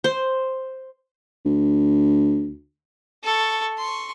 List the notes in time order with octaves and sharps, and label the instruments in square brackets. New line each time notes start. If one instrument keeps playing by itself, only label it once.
[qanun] C5
[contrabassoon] D2
[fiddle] A4 C#6
C6 C#6